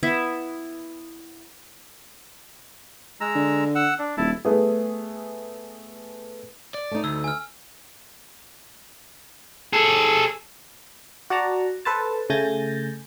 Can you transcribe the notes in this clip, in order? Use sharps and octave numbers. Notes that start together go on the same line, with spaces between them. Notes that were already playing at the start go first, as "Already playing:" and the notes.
B3 E4 E5
G#3 A#5 E6
D3
F#5 E6
D4
D#1 E4 A5
A3 B3 G#4
D5
A3 D#4
D2 E6
G#5 F6
G#4 A4
F#4 D5 F#5 A5 A#5
A4 B4 C5 A5
C#3 A3 G#5 G6 A6 A#6